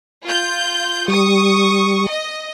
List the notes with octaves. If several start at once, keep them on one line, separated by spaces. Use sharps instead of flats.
F4 G6
G3 C#6 D#6
D#5